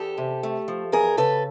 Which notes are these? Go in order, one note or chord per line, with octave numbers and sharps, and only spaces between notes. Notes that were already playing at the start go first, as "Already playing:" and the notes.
Already playing: E2 G4 A4
C3
A3
F3
E2 G#4 A#4
C#3 A4 B4